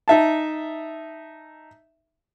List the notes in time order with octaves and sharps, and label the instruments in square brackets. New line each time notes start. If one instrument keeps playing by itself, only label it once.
[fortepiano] D#4 E5 A5